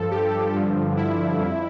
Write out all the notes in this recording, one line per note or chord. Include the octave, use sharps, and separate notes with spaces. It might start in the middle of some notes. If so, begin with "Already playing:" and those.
Already playing: G2 F3 A4
G4
G2 D3 F3
E4
F2